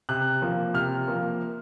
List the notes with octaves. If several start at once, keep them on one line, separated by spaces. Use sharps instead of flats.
C3 F#6
F3 A#3
C3 F6
F3 A#3